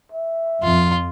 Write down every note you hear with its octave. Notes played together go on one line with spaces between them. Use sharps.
E5
F2 F4